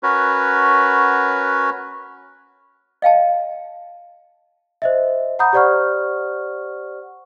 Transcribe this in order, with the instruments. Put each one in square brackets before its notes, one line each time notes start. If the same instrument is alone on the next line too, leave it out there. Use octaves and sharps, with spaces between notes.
[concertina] C#4 F#4 A#4 B4 C#5
[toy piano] D#5 F5 G5 A5
[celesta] C5 D#5 E5
F#5 A#5 B5 D#6 G6
G4 C5 D5 F#5 C#6 F6